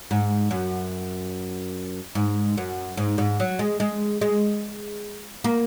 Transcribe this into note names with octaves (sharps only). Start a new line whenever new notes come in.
G#2
F#2
G#2
F#2
G#2
G#2
F#3
G#3
G#3
G#3
A#3